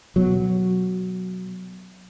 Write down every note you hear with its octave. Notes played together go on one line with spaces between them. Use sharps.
B2 F#3